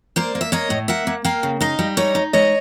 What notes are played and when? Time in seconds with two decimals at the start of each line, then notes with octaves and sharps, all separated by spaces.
0.16 A#3 C5 D5
0.35 A#3
0.41 E5
0.52 A#3 C#5 D#5
0.70 A2
0.88 A#3 E5 F#5
1.07 A#3
1.24 A#3 F5 G5
1.43 C#3
1.61 D#4 D#5 F5
1.79 G3
1.97 D#4 C#5 D#5
2.15 D#4
2.33 G#3 C#5 D#5